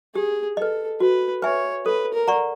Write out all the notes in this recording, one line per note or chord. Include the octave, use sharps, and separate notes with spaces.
G4 G#4
A4 B4 D#5
F#4 B4
B4 C#5 E5 G#5
A4 B4
A#4
D5 F#5 A#5 C#6